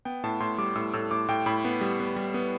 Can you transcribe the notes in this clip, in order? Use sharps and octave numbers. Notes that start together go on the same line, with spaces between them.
B3 G5
A2 A5
A2 C6
G3 D6
A2 E6
A2 E6
A2 D6
A2 G5
A2 B5
B3
G3
B3
G3
B3